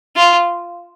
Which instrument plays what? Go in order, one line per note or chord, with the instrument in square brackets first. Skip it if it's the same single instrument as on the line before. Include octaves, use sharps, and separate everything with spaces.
[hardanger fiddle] F4